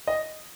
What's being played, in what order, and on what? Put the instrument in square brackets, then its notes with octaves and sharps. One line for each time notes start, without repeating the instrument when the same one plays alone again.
[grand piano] D#5